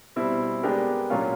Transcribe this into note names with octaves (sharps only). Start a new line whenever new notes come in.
B2 G3 C4 E4
G#3 B3 D4 G4 A#4
A#2 F#3 A#3 C#4 F4